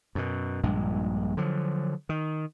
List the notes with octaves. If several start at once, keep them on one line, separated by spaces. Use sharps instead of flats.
F#2 B2
A#1 G2 A#2 G#3
D3 F3 F#3
D#3